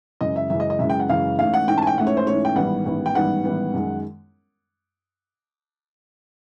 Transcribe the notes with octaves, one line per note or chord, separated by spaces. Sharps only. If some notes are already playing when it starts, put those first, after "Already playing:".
F#2 C#3 E3 G#3 D#5
E5
F#2 C#3 E3 G#3 E5
D#5
D#5
F#2 C#3 E3 G#3 E5
G5
F#5
F#2 C#3 E3 G#3 F5
G#2 E3 A3 C#4 F5
F#5
G#2 E3 A3 C#4 G5
A5
G#5
G5
G#2 E3 A3 C#4 F#5
C#5
C5
G#2 E3 A3 C#4 C#5
G5
A1 G#2 D#3 G3 B3 F#5
A1 G#2 D#3 G3 B3
G5
A1 G#2 D#3 G3 B3 F#5
A1 G#2 D#3 G3 B3
F#2 D#3 G#3